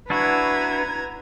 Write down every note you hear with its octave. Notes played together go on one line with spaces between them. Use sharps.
D4 E4 F#4 B4 A#5 G#6